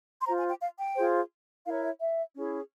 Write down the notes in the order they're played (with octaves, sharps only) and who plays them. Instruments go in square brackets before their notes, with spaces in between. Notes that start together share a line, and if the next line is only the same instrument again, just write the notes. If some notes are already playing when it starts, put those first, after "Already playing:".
[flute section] C6
F4 C5 A#5
G#5
G5
F5
G5
F4 G#4 C5
E4 A#4 C#5 F5
E5
E5
C#4 E4 G#4